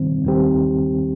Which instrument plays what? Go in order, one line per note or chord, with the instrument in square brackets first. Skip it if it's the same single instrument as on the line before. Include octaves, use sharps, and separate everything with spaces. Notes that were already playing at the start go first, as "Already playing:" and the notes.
Already playing: [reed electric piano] D#3 G3 C4
D#2 D#3 G3 C4 G4